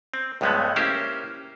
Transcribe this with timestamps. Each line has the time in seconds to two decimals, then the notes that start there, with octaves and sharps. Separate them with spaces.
0.14 C4
0.41 C#2 G2 F3 G#3 A3 B3
0.76 A#3 C#4 E4 G4 C5